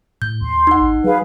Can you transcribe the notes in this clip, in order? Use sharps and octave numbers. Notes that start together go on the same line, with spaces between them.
A2 G6
D#2 C6
D#4 F#5
G#1
F#3 G#4 B4 F5